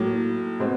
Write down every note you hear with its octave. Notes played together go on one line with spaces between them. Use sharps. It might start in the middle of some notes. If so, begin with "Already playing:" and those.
Already playing: A2 F#3 A#3
B2 G#3 C4